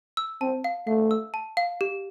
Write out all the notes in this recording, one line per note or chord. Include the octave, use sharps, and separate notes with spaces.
E6
C4 A5
F5
A3 F5
E6
A5
F5
G4